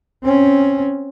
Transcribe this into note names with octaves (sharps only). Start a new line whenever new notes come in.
C4 C#4